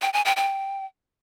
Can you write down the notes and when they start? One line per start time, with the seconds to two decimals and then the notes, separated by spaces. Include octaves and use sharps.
0.02 G5
0.13 G#5
0.25 G5
0.37 G5